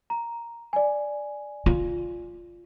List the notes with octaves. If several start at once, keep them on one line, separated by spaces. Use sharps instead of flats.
A#5
D5 G#5
F4